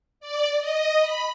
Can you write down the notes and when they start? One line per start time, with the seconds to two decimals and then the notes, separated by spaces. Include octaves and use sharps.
0.20 D5
0.58 D#5
1.00 B5